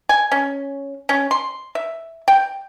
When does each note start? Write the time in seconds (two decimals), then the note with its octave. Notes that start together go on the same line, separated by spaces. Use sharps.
0.09 G#5
0.32 C#4
1.09 C#4
1.31 C6
1.75 E5
2.28 G5